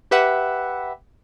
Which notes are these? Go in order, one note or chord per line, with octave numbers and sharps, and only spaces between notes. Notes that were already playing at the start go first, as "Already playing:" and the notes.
G4 B4 E5 F#5